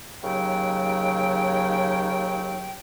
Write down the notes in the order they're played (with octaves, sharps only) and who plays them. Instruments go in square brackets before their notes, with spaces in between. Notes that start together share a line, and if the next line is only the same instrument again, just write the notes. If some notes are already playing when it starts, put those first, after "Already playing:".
[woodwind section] D#2 C#3 F#3 G5